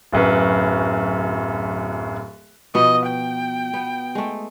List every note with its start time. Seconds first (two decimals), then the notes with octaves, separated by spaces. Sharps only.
0.13 D1 F#2 B4
2.75 B2 F3 B3 D#5
3.06 G5
3.73 B3
4.15 G#3 A3